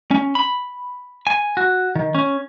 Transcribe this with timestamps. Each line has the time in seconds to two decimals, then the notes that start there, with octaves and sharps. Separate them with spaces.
0.11 C#4
0.35 B5
1.27 G#5
1.57 F#4
1.95 D#3
2.15 C#4